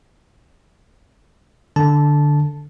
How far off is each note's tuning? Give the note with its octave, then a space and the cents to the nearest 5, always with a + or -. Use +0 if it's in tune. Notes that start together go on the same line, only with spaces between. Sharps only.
D3 +0 A5 -10